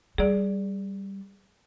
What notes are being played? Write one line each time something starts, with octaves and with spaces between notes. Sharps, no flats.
G3 G#4 D5